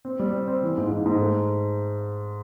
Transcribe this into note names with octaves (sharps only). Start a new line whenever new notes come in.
C4
G3
C4
C4
E3
G#2
G#2
G#2
A3